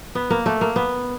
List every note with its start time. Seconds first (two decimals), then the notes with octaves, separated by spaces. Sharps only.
0.15 B3
0.30 A#3
0.46 A3
0.61 A#3
0.76 B3